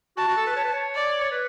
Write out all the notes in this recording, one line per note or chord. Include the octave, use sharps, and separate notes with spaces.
F#4 A5
F#4
A4
B4
C#5
B4
C#5
D5
C#5
B4